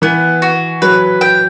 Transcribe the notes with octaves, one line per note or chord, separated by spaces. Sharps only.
E3 B3
F#4
F#3 B4
G5